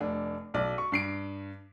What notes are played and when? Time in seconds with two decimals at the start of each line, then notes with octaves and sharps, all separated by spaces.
0.01 F1 D4
0.54 B1 D5
0.78 C#6
0.92 G2 C7 D7